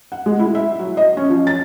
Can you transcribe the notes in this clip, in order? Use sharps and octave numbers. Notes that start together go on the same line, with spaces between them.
F#5
G#3
E4
E5
F#3
D#5
C#4
F3
A6